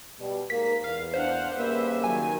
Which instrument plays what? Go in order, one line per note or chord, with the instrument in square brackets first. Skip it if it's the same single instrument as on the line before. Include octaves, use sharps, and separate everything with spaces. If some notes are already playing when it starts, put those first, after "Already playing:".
[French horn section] B2 G3
[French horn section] G#2 A#3 A#4 [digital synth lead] B6
[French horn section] E2 [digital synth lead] F5
[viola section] D4 F5 F#5 [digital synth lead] C5
[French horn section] C#3 G3 A#3 [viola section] B4 E5
[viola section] D#3 F#3 [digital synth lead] G#5